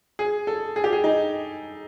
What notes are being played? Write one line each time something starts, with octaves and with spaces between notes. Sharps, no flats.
G#4
A4
G#4
G4
G#4
D#4